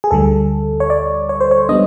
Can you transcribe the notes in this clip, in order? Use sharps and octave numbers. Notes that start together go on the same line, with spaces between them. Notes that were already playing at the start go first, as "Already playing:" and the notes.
G#4
D2 D3 G3 A4
C#5
D5
C#5
C5
C#5
G3 B3 D4 D#5